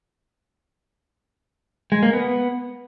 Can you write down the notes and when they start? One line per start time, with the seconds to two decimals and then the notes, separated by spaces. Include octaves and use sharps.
1.92 G#3
2.03 A#3
2.13 B3